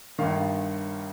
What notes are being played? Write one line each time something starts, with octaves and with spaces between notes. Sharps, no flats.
G1 G2 D#3 F5